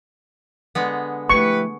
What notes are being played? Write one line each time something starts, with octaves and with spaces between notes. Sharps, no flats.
D3 G#3 B3
F3 A3 E4 G4 B4 C#6